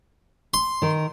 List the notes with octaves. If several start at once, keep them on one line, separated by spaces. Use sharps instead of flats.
C6
D#3 A#4